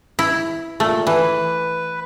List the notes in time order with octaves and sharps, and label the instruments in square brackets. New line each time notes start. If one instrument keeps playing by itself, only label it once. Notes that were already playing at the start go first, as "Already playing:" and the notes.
[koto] E4
[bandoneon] A#2 [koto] A3
[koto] E3 [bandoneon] B4